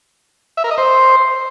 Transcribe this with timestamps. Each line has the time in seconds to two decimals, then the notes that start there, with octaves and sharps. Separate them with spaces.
0.57 E5
0.64 A#4
0.71 D#5
0.78 C5